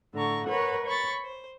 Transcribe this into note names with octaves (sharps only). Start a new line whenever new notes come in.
A2 D3 A#5 C#6
A#4 B4 C#5 F#5
C#5 B5 C#6 A6
C5